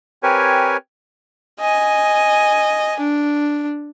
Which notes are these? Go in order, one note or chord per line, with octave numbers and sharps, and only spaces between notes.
C4 G4 A#4 B4 C#5 G#5
D#5 G#5
D4